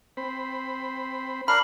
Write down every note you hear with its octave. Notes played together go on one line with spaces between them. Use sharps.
C4 C5 B5
D4 A#4 F5 B5